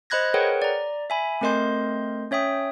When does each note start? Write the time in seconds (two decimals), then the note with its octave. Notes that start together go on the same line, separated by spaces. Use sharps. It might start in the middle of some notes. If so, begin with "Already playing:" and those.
0.10 C5 D#5 B5 F#6 G#6 A#6
0.34 G#4 A#4 B4 C#5 F#5 G5
0.62 D5 A#5
1.10 E5 G#5 B5
1.41 A3 C4 A#4 D#5 C6 G6
2.31 C#4 C#5 E5 G5 D#6